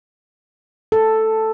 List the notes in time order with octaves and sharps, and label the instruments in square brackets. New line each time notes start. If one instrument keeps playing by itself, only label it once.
[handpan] A4